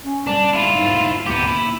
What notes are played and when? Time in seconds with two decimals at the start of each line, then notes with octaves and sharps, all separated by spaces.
0.04 C#4
0.27 G3 D4
0.53 E4 F4
0.72 G#2
1.26 D2 B3 G4
1.48 A#3 E4